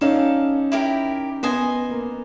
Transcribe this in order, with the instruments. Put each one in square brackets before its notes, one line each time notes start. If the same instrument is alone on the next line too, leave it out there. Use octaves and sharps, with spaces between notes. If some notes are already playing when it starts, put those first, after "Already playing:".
[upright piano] C#4 D#4 [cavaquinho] A4 D5 F5
[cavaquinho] E4 G4 A#4
[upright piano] B3 [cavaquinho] C5 D#5 G#5
[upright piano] A#3